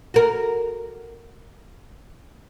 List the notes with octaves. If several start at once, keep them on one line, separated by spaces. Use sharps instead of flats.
F#4 A#4